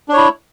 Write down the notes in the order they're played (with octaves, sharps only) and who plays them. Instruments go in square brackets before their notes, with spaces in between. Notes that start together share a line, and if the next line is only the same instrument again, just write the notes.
[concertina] D4
C#5
E4